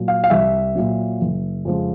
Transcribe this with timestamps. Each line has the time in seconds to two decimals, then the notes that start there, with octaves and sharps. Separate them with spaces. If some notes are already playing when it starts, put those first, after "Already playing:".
Already playing: A#2 F#3
0.08 F5
0.24 F5
0.30 C2 E5
0.75 A#2 F#3
1.21 F#1
1.65 F2 C#3 F3 G#3